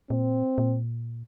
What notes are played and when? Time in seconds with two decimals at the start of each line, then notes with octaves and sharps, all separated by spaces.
0.10 A#2 C4
0.58 A#2